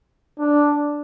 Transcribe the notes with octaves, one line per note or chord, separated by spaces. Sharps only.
D4